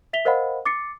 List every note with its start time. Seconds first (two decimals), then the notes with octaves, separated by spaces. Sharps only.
0.13 E5 B6 F7 G7
0.25 A#4 C5 D#5 F5 F#5 B5
0.65 D6 A6 C7 C#7